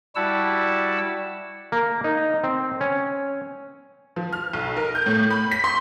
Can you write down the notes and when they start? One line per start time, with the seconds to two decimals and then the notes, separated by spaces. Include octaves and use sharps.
0.15 G3 E4 F#4 F#5 A5 E6
1.72 A#3
2.04 D#4
2.44 C4
2.81 C#4
4.16 F3
4.33 F6
4.53 B1
4.77 A#4
4.95 G6
5.06 A2
5.30 B5
5.51 B6
5.64 C6